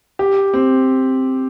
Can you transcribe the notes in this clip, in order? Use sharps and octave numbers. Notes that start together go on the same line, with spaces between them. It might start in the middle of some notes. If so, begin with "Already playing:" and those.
G4
C4